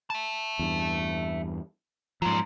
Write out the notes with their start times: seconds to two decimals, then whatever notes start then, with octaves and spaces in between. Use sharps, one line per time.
0.10 E5 A5
0.59 E2 G2
2.22 G#2 F3 F#3 F4